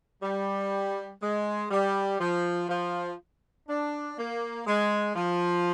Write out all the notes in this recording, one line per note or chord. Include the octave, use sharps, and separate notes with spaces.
G3
G#3
G3
F3
F3
D4
A#3
G#3
F3